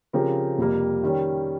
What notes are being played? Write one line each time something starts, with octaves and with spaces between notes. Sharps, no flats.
C#3 F3 C4 G4 A#4
F2 C3 G3 A#3
D#3 G3 C#4